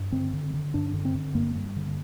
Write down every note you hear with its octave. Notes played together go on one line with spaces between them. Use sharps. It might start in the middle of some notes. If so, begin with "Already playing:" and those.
Already playing: G2
D3 C4
D3
D3
G2 D4
D3
C4
D3
G2 A#3
G2
D3